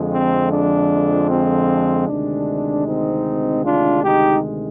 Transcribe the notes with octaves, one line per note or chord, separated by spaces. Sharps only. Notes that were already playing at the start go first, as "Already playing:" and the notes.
Already playing: F2 D3 F3 G#3
C4
D4
C4
D2 C3 D#3 G#3 D4
C4 D#4
D4 F4
D#4 G4